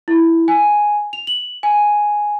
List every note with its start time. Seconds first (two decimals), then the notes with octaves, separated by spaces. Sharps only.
0.08 E4
0.48 G#5
1.13 F7
1.27 F#7
1.63 G#5